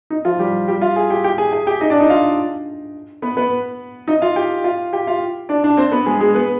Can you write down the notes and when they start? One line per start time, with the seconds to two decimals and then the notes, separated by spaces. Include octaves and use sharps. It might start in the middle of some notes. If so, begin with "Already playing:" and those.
0.10 D#4
0.25 F3 F4
0.39 G3 G4
0.68 G3 G4
0.82 F4 F5
0.96 G#4 G#5
1.10 G4 G5
1.24 G4 G5
1.38 G#4 G#5
1.53 G#4 G#5
1.67 G4 G5
1.81 D#4 D#5
1.90 D4 D5
2.00 D#4 D#5
2.10 F4 F5
3.22 B3 B4
3.37 B3 B4
4.08 D#4 D#5
4.22 F4 F5
4.36 G4 G5
4.64 F4 F5
4.93 G4 G5
5.07 F4 F5
5.49 D4 D5
5.64 D4 D5
5.77 C4 C5
5.92 B3 B4
6.06 G#3 G#4
6.21 G#3 G#4
6.34 B3 B4